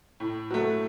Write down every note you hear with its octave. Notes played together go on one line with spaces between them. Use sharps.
A2
F#3 A3